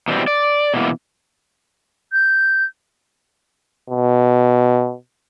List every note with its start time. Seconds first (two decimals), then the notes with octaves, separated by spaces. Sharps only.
0.08 B2 E3 G3 C4
0.27 D5
0.74 B2 E3 A#3
2.13 G6
3.90 B2